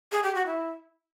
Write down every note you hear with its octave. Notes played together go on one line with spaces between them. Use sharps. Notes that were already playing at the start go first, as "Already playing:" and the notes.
G#4
G4
F#4
E4